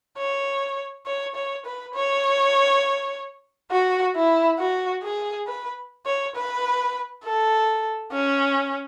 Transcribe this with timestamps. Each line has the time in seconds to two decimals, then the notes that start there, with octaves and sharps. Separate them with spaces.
0.18 C#5
1.06 C#5
1.35 C#5
1.66 B4
1.94 C#5
3.71 F#4
4.16 E4
4.59 F#4
5.03 G#4
5.47 B4
6.06 C#5
6.35 B4
7.24 A4
8.12 C#4